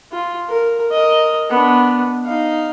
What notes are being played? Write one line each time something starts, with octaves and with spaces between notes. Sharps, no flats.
F4
A#4
A#4 D#5
B3 D4
D#4 F5